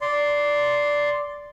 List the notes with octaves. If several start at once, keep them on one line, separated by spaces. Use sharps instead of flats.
D5 C6